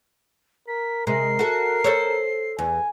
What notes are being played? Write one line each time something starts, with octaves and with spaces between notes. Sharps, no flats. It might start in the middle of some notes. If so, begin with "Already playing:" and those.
A#4 B6
C3 G#3 A#4 C7
F#4 A4
A4 C5 C#5
E2 G#5